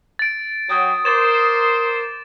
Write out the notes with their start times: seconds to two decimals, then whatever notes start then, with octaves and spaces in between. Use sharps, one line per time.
0.19 A6 D7
0.70 F#3 G5 D#6
1.05 A#4 C5 C6 D6 A6 E7